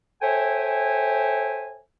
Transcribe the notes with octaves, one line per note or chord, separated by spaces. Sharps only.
A4 C5 C#5 E5 G5 G#5